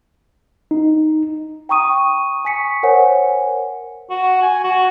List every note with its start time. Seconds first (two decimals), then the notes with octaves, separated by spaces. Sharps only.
0.71 D#4
1.69 G5 A#5 C#6 D#6 D#7
2.45 G#5 C#6 B6 C#7
2.83 A#4 C5 C#5 F#5 G#5
4.10 F#4
4.42 G#5
4.64 F#4